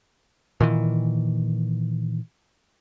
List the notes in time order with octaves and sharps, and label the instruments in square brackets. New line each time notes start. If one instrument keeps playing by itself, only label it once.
[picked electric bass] A#2 D#3 E3